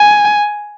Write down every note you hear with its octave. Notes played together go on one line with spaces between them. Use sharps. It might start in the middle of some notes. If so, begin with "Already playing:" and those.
Already playing: G#5